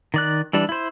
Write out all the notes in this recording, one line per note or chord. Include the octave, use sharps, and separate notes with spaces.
D#3 D5 F#6
E3 G3 D4
E4 C5